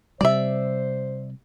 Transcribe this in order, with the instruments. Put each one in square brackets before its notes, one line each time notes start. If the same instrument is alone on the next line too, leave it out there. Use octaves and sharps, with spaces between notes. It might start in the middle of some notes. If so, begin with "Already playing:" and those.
[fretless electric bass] C3 G3 [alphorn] C5 [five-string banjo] D5 E5